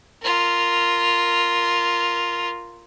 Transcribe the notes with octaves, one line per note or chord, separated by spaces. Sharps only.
F4 A#4